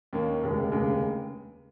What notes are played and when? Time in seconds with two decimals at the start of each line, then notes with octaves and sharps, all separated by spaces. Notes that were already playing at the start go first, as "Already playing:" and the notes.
0.13 D#2 D#3 A#3 C#4
0.42 F1 D#2 C#3 G#3
0.71 F1 D#2 C#3 G#3